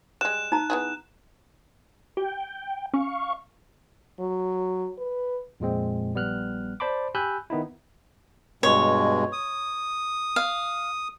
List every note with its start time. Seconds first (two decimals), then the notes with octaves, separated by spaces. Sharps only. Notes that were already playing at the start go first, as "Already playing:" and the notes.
0.21 G3 G#3 F#6 E7
0.52 D#4 A#5
0.70 B3 E4 G#4
2.17 G4 G5
2.94 C#4 F5 C#6
4.19 F#3
4.98 B4
5.60 F2 A#2 G#3 C4
6.14 A#1 G3 B3 F6 F#6
6.80 C5 D5 A5 B5 C6 D6
7.15 G4 G#5 B5 E6 F#6 G6
7.50 D#3 B3 D#4 E4
8.63 G2 B2 G#3 C#5
9.32 D#6
10.36 F5